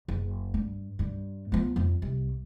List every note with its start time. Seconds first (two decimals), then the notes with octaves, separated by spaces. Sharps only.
0.08 F#1
0.54 G2
0.99 G2 G3
1.52 F3 B3
1.76 F2
2.02 C2